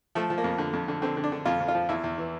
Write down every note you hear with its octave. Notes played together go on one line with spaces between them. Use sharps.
F3 A3
F3
A#3
F2
D3
F2
D3
D3 C4
D3
D4
D3
F2 F4
F2
F4
F3
E2 E4
E2
E3